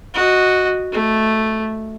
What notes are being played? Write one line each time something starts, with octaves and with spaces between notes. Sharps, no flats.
F#4 D#5
A3